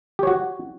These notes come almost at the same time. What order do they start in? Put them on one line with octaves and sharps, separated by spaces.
G4 C#5 F#4